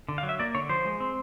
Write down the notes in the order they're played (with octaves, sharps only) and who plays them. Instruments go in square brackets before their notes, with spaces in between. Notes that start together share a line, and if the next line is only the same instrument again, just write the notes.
[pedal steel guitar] D3
F5
F#3
E5
A#3 D5
D3 C#5
F3 C5
G#3
C4